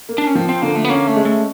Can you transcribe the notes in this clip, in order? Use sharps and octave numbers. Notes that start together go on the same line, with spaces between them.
A#3
D4
C#4
F3 C4
C4
D3 A#3
A3
B3
A#3 C#4
A3
G#3
A3